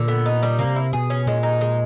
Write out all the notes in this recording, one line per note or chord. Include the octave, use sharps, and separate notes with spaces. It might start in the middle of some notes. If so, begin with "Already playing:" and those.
Already playing: A#2 D3
B3
D#4
G3
C3 A#3
E4
B2 G#4
C#4
A#2 G#3
D#4
G#3